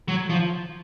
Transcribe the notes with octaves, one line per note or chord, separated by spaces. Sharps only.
F#3
F3